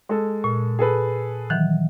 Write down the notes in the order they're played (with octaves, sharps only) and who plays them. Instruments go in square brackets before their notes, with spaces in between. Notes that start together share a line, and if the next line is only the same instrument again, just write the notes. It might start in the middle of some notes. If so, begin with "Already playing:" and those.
[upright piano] G#3 A4
[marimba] A#2
[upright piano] G#4 A4 B4
[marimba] D#3 E3 F#3